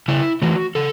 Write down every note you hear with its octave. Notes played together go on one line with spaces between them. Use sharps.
C#3 E4
E3 A3 F#4
C#3 A4